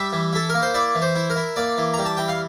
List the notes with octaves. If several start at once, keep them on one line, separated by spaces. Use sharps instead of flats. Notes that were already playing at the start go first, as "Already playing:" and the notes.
Already playing: G3 E5
E3
E4 A4
A#3 A#4
C5
E4 D5
E3
C5
E4
A#4
E4
A#3 D5
E3
G3 A#5
A5
E3 G5
F5